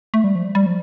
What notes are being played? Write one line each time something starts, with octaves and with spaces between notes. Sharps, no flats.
A3
G3
F3
G3
G3
F3